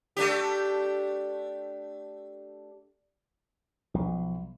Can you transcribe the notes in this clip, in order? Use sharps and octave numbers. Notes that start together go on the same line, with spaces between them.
A3 D4 G4
B1 F3